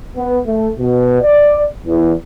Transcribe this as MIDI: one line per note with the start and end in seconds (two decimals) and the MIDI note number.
0.16 0.37 59
0.46 0.68 57
0.79 1.19 47
1.22 1.63 74
1.85 2.13 40